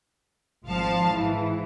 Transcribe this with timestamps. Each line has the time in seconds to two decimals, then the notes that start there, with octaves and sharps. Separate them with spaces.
0.66 G#1 F3 F5 A5
1.11 G#2 E3